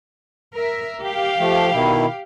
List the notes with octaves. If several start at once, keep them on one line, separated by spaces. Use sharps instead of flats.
A#4 E5
G4 F5
F3 A3
B2 D#3 E4